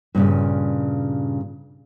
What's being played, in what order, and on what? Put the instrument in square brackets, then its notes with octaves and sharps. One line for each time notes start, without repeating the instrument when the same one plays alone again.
[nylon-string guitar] G2 A#2 C#3